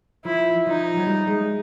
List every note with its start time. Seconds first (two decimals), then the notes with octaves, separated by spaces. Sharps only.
0.25 F3 E4
0.67 F3 D#4
0.97 F#3
1.07 G3
1.27 G#3